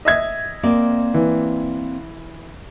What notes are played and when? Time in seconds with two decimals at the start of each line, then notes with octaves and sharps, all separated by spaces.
0.05 D#5 E5 G#6
0.63 A#3 C4 D5
1.14 E3